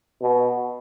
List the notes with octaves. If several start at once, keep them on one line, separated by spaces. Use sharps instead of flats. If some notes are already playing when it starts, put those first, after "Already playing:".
B2